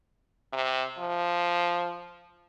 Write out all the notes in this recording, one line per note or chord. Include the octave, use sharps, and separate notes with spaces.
C3
F3